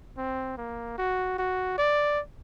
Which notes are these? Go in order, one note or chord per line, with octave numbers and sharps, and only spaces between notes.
C4
A#3
F#4
F#4
D5